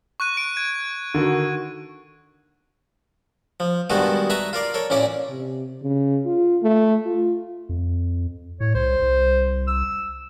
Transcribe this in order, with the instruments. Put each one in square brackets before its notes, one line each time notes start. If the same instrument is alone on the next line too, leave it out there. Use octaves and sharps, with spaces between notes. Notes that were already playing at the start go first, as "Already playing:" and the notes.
[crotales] C#6 F#6 D#7
D7
G#6
[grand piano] D3 D#3 F#4
[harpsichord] F3
G2 B2 D#3 G#3 F#4 A4
B4 E5 A5 A#5 C#6
F4 A#4 D5 F5
A4 A#4 C#5
A1 A#2 C#4 E4 C#5 D5
[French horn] C3
C#3
F4
A3
F4
[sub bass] F2
[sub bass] A2 [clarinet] C#5
[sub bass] C2 [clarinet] C5
[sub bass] C2
[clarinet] E6